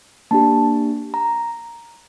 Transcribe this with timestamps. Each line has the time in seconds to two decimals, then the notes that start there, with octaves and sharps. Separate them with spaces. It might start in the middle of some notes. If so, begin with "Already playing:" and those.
0.31 A#3 D4 G4 A5
1.14 A#5